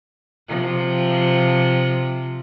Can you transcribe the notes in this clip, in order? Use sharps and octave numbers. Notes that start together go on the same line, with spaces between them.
C3 F3